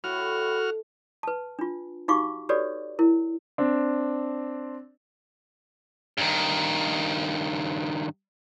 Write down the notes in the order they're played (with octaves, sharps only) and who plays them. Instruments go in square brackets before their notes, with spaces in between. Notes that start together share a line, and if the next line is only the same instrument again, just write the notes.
[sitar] A2 [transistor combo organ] F#4 F6
[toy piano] B4 A5
D4 F4
D#4 F#4 G4 F5 C#6 D6
F#4 G4 A4 B4 C#5 D5
E4 A#4
[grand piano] C4 D4
[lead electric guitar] G2 D#3